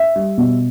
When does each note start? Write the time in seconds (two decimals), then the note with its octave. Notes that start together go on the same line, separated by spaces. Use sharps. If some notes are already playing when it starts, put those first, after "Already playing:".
Already playing: E5
0.16 G3
0.38 B2